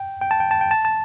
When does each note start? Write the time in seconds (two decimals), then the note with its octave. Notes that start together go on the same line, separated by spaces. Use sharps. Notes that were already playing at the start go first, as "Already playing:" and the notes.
Already playing: G5
0.21 G5
0.31 A5
0.40 G5
0.51 A5
0.61 G5
0.71 A5
0.85 A5